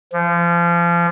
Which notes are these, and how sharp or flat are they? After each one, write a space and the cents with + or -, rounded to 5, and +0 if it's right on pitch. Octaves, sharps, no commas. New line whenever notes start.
F3 -30